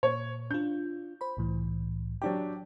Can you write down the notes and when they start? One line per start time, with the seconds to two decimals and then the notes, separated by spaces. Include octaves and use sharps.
0.03 A#2 C#5
0.51 D4 F4 G6
1.21 C5 B5
1.37 C2 A2 E3
2.22 F#3 D4 G4 G5